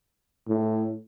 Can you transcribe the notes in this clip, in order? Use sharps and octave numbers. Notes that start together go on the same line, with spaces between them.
A2